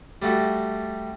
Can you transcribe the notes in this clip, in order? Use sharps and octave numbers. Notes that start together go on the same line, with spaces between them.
G3 A3 F#4